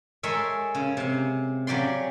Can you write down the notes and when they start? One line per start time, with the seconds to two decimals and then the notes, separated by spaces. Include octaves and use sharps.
0.23 G#3 A4 A#4 C#5 E5
0.75 C#3
0.97 C3 F5
1.67 C#3 F#3 G4 D5 C6